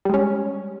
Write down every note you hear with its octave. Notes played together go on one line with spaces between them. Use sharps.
G3 G#3 C#4